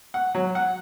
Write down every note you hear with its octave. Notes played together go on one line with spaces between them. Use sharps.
F#5
F#3
F#5